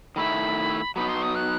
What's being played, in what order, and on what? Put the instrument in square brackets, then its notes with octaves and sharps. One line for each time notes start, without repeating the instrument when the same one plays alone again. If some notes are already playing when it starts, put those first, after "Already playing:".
[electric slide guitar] D#3 A3 E4 [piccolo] B5
[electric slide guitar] F#3 B3 D#4 [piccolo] B5
[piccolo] C6
D#6
F#6